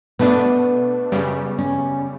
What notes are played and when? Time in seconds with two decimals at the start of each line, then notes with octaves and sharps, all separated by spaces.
0.19 B2 A3 B3 D4
1.12 F#2 C#3 G3
1.59 C#4